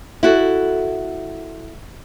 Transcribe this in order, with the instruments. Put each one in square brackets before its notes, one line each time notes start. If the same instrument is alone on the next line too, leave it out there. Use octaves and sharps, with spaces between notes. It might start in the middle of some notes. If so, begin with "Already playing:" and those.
[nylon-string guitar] E4 F#4 A4